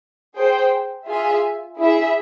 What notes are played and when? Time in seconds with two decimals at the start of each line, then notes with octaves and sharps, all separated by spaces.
0.35 G#4 C5 G5
1.07 F4 G#4 E5 G#5
1.79 E4 G#4 E5